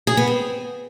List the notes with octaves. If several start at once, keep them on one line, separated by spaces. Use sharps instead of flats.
G#4
B3
C4